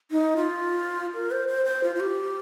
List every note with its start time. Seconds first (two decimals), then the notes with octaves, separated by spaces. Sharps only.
0.11 D#4
0.36 F4
1.14 A#4
1.31 C5
1.48 C5
1.66 C5
1.83 F4
1.95 F4
2.00 G4